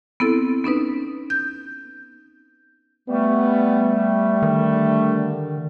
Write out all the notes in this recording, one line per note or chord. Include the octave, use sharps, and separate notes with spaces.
B3 C4 E4 A4
B3 C#4 D#4 B4
G6
G3 A3 B3
D3 D#3